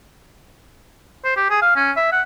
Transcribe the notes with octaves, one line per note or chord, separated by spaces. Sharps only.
C5
G4
G#4
F5
C#4
E5
F#5